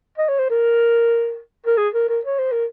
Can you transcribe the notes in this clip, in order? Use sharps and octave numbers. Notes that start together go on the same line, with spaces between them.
D#5
C#5
C5
A#4
A#4
G#4
A#4
A#4
C#5
C5
A#4